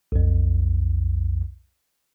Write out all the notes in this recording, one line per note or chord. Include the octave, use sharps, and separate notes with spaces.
B1 F2